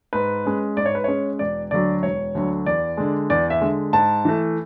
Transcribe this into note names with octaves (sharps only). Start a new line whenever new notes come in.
G#2 B4
G#3 C#4
G#2 D5
C#5
B4
G#3 C#4 C#5
E1 D5
D2 D3 F#3 D5
E1 C#5
D2 D3 F#3
E2 D5
D3 G#3
E2 D5
E5
D3 G#3
G#2 A5
E3 A3